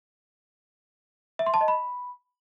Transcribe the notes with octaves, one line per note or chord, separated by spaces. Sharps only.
E5
C6
A5
D#5
B5